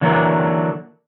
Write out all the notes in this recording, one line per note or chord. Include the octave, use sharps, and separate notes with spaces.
D3 E3 F#3 A#3 D4